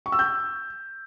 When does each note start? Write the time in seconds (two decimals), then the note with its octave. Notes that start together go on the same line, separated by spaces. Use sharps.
0.06 C#6
0.12 E6
0.19 G6